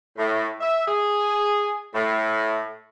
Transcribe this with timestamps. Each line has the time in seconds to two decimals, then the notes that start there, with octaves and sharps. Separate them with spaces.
0.18 A2
0.61 E5
0.87 G#4
1.94 A2